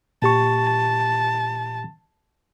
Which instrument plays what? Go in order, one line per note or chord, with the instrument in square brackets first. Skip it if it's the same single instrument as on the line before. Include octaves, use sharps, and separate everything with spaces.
[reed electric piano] A#2 G4 C#6 [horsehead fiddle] A5